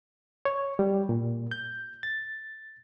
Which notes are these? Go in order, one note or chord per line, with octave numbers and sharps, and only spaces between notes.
C#5
G3
A#2
G6
A6